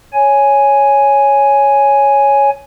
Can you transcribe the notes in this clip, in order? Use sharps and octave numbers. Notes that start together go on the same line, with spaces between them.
C#5 G#5